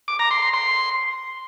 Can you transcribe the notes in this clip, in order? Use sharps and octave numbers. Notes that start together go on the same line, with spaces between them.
D6
A#5
C6
C6
C6